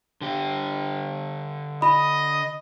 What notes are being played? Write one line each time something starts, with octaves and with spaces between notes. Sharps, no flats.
D3 G4
D#5 B5